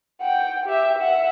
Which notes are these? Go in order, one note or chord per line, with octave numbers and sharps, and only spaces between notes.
F#5 G5
G4 E5
E5 F#5